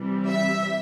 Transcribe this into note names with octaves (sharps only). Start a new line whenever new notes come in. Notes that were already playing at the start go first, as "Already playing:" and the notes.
Already playing: C3 E3 G3
E5